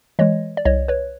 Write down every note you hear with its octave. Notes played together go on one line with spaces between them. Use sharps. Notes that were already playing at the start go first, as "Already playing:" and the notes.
E3 G#3 C#5 D#5
D5
C2 C#5 D#5
B4 C#5